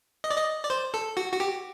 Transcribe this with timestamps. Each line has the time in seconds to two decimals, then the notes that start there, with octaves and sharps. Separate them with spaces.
0.24 D#5
0.31 D5
0.37 D#5
0.63 D5
0.70 C5
0.94 A4
1.17 F#4
1.33 F#4
1.40 G4